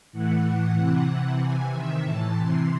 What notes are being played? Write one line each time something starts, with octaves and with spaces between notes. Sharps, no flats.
A2 E3 F#5
A2 E3 F#5
C3 E3
C3 E3 F#5
C3 E3 G#5
C3 D#3 E5
A2 E3 A5
C3 E3 C6